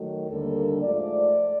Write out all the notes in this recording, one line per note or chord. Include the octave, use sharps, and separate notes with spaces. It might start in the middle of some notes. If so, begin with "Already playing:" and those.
Already playing: D#3 F#3 A3
D#2 D3 G3 A#3 D4 A4
G#2 F3 A3 D5